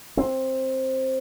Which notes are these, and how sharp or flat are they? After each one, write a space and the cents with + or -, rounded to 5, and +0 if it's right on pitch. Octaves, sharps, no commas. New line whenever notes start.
C4 +10